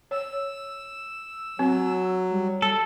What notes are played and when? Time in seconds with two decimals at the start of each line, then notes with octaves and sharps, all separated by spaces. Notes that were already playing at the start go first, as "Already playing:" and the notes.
0.11 C#5 E6
1.59 F#3 C4
2.31 G3
2.62 A4